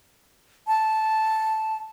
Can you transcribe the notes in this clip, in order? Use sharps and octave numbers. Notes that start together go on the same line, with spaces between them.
A5